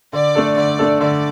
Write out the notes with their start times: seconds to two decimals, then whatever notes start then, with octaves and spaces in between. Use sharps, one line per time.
0.13 D3 D5
0.35 A3 D4 A4
0.56 D3 D5
0.79 A3 D4 A4
1.00 D3 D5